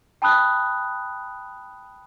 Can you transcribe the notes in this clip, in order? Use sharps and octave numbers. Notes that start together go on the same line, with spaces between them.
G5 A5 B5 D#6 F#6